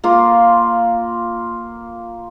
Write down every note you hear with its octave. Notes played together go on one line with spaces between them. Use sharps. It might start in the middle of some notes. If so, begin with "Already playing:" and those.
A#3 F4